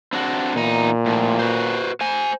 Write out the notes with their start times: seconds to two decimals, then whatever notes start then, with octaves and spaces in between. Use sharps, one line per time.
0.13 C4 D4 F#4
0.56 E2 A#2 D#4
1.06 A2 F3
1.39 F#4 B4 C5
2.01 C5 G#5